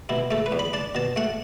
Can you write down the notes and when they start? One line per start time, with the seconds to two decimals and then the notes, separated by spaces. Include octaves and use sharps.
0.09 B2 E4
0.31 A3 A4
0.46 B4
0.52 E2
0.59 B5
0.73 D4 A5
0.95 B2 A5
1.16 A3 F#5